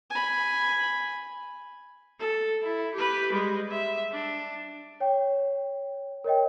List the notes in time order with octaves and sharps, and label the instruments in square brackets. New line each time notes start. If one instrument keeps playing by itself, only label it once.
[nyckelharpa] G#5 B5
[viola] A4
E4
G4 B4
G3 G#3
E5
D4
[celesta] C#5 G5
A#4 C#5 D#5 G5